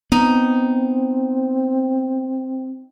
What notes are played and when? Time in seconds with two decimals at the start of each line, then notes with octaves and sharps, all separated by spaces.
0.12 B3 C4 D#4